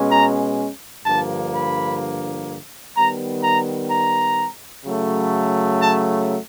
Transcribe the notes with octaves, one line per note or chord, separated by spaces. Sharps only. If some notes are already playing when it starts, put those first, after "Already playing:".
Already playing: B2 G#3 C#4
A#5
G2 D3 F3 A#3 A5
B5
D#3 G3 B3 A#5
A#5
A#5
C#3 F#3 A3
A5